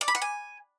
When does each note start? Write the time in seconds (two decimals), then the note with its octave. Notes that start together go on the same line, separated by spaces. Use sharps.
0.01 D5
0.08 B5
0.15 F#5
0.22 G#5